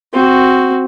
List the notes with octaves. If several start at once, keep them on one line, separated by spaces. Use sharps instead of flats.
C4 F#4